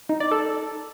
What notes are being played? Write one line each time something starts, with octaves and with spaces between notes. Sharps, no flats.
D#4
D5
A4